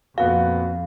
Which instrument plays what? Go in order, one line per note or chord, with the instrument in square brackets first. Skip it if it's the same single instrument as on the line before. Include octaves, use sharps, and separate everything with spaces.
[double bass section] F2 [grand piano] A#2 B3 F#4 [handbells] F5